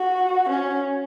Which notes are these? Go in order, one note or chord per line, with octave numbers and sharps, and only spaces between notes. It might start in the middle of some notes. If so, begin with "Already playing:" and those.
Already playing: F#4
C#4